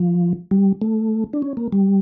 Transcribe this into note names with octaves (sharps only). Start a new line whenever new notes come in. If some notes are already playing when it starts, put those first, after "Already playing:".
Already playing: F3
G3
A3
D4
C#4
A#3
G3